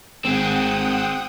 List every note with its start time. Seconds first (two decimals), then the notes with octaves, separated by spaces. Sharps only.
0.25 G#1 C4 G#4 F#5 G5 D#6